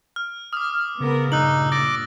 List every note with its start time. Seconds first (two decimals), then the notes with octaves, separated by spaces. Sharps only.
0.16 F6
0.53 D6 D#6 F6
1.00 C#3 B3 A#4
1.32 G2 A#2 D#4 E6 F#6 F#7
1.72 D6 E6 A6 A#6